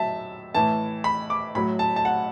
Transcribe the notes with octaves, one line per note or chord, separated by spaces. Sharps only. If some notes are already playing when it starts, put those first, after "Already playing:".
Already playing: A2 F#3 E5 A5
A2 E3 A5
B5
D6
A2 F#3 B5
A5
A5
F#5